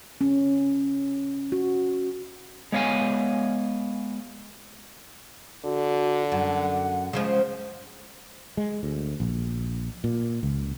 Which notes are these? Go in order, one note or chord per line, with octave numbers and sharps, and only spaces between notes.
C#4
F#4
G#3 B3 C#5 F5 G#5
D3 F#4
F#2 F#5
C#3 F3 G#3
G#3
D2
A#1
A#2
C#2